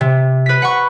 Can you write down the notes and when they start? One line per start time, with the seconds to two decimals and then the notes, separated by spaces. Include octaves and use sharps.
0.01 C3
0.46 B4 B6
0.62 F#5 B5 C#6